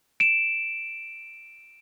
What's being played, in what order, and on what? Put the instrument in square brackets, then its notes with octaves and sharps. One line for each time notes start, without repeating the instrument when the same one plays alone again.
[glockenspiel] D7 E7